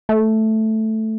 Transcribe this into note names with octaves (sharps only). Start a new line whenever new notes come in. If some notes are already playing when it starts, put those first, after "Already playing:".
A3